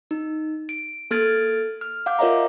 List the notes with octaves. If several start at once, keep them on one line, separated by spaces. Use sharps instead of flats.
D#4
D7
A#3 A4 F6 G#6 A6 D7
F6
F5 F#5 D6 G6
F4 A#4 C#5 D#5 E5 A#5